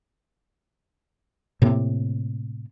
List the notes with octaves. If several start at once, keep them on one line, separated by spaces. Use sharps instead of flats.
A2 C3 A#3